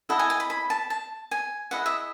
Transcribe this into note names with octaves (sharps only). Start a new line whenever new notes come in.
E4 A4 D#5 F#5
G#5
G#5
B5
B5
A5
A5
G#5
E4 G#4 D#5 F#5
E5